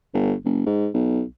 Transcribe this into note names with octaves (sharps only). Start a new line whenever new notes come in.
G1
F#1
G#2
B1